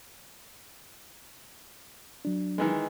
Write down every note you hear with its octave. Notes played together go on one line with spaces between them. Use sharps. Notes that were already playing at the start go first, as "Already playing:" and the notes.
F#3 D4
D#3 E3 G#3